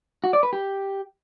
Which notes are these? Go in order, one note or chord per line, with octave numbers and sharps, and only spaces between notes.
F#4
D5
B4
G4